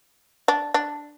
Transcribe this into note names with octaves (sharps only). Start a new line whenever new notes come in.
D4
D4